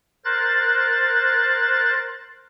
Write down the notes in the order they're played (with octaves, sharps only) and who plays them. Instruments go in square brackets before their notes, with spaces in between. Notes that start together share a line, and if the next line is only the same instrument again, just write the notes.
[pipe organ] A#4 C5 F#6 A6